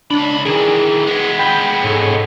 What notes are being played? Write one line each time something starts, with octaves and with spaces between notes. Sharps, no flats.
C#2 D4 B5
D#3 E3 G#4
G#3 B3
G5 B5
G#2 A4 C#5